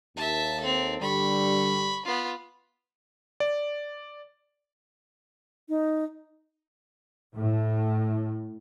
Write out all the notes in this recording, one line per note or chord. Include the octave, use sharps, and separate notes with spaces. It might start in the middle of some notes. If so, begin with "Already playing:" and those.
D#2 E5 A5
C4 A4
G2 D3 G3 B5 C#6
B3 F4
D5
D#4
A2